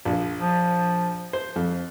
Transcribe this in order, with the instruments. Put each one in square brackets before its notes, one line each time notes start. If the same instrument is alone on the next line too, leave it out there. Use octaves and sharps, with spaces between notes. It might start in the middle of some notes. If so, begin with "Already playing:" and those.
[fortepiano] A#1
[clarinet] F3
[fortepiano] C5
F2